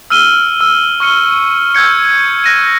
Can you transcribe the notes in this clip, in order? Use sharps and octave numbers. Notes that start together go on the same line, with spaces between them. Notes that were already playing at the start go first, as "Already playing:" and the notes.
E6 F6 D#7 G7
E6 F6
C#6 F6 C#7 G7
E6 G6 G#6 C#7
F#6 A#6 D#7